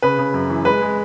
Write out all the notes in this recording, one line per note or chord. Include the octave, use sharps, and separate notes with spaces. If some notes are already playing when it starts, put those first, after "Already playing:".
C#3 B4
C#3
F#2
E3
G#3 B4
G#3